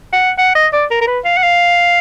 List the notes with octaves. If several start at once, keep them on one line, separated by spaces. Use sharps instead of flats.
F#5
F#5
D#5
D5
A#4
A#4
B4
F5
F#5
F5